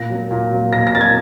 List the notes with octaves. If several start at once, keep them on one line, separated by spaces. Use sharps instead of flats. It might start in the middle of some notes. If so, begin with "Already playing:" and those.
Already playing: A#2 A#6
F#3 A#3
A#2
F#3 A#3
A#2 A#6
A#6
F#3 A#3 G#6 A6